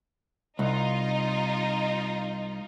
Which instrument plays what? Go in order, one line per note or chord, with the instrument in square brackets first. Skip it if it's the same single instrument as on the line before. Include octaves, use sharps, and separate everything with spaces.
[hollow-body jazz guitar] C2 [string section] D#4 F4